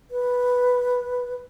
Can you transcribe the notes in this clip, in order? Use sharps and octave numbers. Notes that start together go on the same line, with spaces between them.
B4